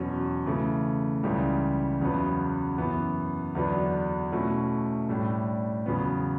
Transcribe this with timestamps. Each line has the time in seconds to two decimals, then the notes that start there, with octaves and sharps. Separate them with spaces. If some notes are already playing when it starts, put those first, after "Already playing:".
Already playing: E2 B2 F#3 C#4
0.46 C#3 E3 A3
1.23 C#2 C#3 E3 G3
2.01 E2 C#3 F#3 B3
2.78 F#2 E3 B3
3.55 E2 D3 F#3 B3 D4
4.32 B2 A3 C#4 E4
5.09 A2 G3 D4
5.86 E2 C#3 F#3 B3